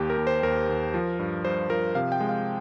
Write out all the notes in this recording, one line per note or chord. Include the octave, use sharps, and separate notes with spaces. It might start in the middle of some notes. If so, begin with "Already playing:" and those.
Already playing: D#2 G4
A#4
D#2
C5
D#2 A#4
D#2
F3
G2
G2 C5
F3 A#4
C3 F5
G5
G#3
F5